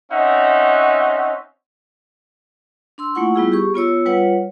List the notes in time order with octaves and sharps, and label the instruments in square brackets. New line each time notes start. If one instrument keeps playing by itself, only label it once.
[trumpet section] C4 C#4 D#4 E5 F#5
[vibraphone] D4 C6 E6
A3 A#3 E4 F4 F#5 C#6
G3 B3 E4 F4 G#4 E6
G4 G#4 C#6
B3 F4 C#5 E6
G3 F4 B4 C#5 F#5